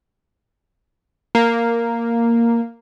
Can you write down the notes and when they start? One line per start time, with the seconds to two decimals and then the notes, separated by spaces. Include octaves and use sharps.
1.35 A#3